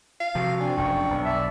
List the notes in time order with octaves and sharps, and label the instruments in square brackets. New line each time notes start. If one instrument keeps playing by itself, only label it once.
[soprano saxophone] F5
[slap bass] C3 F3 [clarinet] F#4
[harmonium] C4 G#5 [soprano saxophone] D4
[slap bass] F1 F#2 [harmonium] G5 [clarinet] C#6
[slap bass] B1
[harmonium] D5 A5 [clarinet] E5